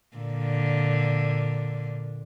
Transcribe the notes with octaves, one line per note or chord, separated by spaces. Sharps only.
A#2 D3